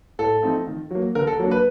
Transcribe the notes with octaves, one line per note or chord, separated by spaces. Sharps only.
A2 A4
F3 A3 C4 D#4
D#3
F#3 A#3
D3 A#4
A4
F#3 A#3 D4
B4